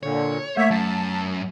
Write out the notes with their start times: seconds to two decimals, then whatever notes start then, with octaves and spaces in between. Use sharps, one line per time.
0.03 A#2 D3 C#5
0.57 A3 A#3 C#5 E5
0.71 F#2 A5